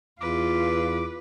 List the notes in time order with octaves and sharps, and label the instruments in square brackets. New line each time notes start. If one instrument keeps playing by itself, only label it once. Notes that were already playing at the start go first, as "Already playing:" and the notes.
[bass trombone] E2 [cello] F4 [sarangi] B4 [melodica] D6